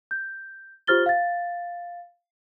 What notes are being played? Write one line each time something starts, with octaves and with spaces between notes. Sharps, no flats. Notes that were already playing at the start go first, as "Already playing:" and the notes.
G6
F4 G4 C5 F6 A6 G7
F5 A6